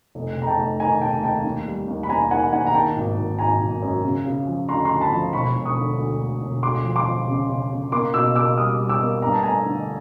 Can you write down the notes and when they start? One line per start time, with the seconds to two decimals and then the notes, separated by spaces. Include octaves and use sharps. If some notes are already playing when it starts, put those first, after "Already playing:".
0.15 F1
0.37 F1
0.42 A#5
0.47 G5 A5
0.58 F1
0.80 D#3 G#5 A#5
1.01 F1 G5 A5
1.23 D#2 G5 A5
1.44 D#2
1.66 G3
1.88 D#2
2.03 B5
2.09 D#2 G#5 A#5
2.31 D#3 F#5 G#5
2.52 D#2 F#5 G#5
2.67 A#5
2.74 D#3 G5 A5
2.96 G#1
3.17 G#1
3.39 G#1 G#5 A#5
3.60 G#1
3.82 F#2
4.04 C#3
4.26 C#3
4.47 F3
4.69 D2 A#5 C6
4.85 A#5 C6
4.91 D2
5.01 A5 B5
5.12 F3
5.33 E1 B5 C#6
5.55 E1
5.65 C#6 D#6
5.77 D3
5.99 D2
6.20 D2
6.42 E1
6.63 D2 C6 D6
6.84 F3
6.96 C6 D6
7.06 F3
7.28 C#3
7.49 C#3
7.71 C#3
7.92 A#3 C6 D6
8.14 B2 D6 E6
8.36 A#3 D6 E6
8.57 G3 D#6 F6
8.79 G3
8.89 D6 E6
9.00 A#3
9.22 G2 A#5
9.32 A5
9.43 A3 G#5 A#5
9.66 D3